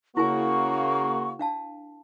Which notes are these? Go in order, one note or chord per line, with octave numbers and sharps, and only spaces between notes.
C#3 A#3 E4 F#4 A#4 G#5 C#6
D4 F5 A5